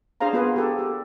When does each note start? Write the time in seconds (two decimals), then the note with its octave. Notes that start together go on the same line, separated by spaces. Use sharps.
0.20 D4 G#4 C5 F5 A#5
0.33 A#3 B3 F4 G#4 B4
0.56 G4 A4
0.79 G4